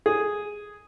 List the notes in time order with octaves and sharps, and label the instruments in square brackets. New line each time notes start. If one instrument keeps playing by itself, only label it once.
[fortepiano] G#4